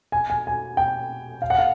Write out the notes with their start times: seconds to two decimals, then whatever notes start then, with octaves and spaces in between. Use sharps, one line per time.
0.12 G#5
0.30 G#5
0.47 G#5
0.77 G5
1.42 F5
1.50 F#5
1.58 F5